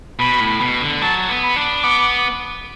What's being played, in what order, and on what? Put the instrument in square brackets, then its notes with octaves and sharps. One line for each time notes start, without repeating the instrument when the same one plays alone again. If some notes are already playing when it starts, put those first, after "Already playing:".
[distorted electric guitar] B2 [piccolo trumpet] B5
[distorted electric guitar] A2
B2
D3
[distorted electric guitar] F#3 [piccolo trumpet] A5
[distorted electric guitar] B3
[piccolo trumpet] B5
[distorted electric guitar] D4
[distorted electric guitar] B3 [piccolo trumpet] D6